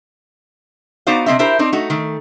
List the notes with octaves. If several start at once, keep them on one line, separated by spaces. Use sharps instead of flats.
B3 D#4 F#4 C5 D5 F5
C3 A3 C4 D#5 E5
D4 E4 G4 A#4 C5 E5
C4 D4 D#4
A3 D#4 F#4
D#3 A3